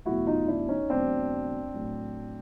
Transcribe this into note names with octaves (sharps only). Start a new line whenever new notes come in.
E2 B2 F#3 A3 E4 F#4
D#4 F4
D4 E4
C#4 D#4
E2 B2 F#3 A3 C4 D4
A2 F#3 A3